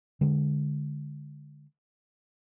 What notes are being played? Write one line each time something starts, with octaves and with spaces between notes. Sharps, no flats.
D3 G#3